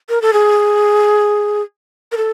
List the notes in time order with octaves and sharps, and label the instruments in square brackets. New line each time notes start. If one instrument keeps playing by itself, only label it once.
[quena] A#4
A4
G#4
A#4
A4